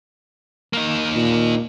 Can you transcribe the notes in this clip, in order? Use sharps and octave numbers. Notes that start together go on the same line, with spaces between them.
A#3 D#4
A#2